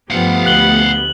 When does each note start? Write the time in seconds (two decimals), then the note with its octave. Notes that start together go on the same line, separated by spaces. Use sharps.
0.10 G2 F3 A3 B3 G4 F5 F#5
0.46 D2 F#6 F#7 G7